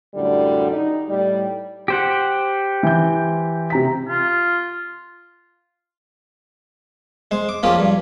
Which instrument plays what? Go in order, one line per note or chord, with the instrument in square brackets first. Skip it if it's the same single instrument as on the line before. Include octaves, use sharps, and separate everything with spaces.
[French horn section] F#2 A2 D3 G3
D#4
A2 G3
[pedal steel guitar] G4 C5 F#5
[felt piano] E3 G6
C3 A#5 B6
[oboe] F4
[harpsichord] G#3 C5
D6
F3 A#3 C#4 F4 G4 G#4
G2